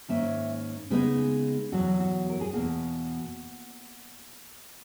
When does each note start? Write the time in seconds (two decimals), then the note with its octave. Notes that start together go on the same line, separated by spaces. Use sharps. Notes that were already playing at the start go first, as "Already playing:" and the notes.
0.09 G#2 D#3 A#3 C#4 E5
0.90 C#3 G#3 B3 D#4 B4
1.72 E2 B2 F#3 F#4
2.00 F#4
2.30 A#4
2.41 G#4
2.53 E2 B2 A#3 F#4